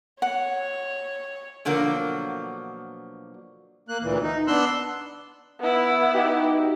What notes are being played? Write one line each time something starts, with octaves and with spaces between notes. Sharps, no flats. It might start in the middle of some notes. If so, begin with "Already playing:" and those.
C#5 F#5
B2 D3 F3 F#3 A#3
A#3 F#6
D2 A#2 E3
D#4
B3 D4 C6 E6 F#6
B3 E4
D#4 F#4 G4